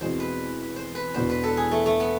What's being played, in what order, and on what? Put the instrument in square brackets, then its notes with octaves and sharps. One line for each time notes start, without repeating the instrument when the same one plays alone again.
[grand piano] E2 B2 G#3 C4 [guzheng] C5
[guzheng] B4
C5
B4
[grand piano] E1 E2 B2 B3 D4 [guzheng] C5
[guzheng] B4
A4
G#4
A3
A3
B3